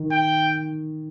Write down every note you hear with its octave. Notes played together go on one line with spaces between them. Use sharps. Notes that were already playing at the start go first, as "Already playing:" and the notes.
Already playing: D#3
G5